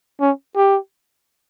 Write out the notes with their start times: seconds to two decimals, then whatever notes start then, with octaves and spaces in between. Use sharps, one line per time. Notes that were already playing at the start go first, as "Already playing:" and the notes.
0.20 C#4
0.56 G4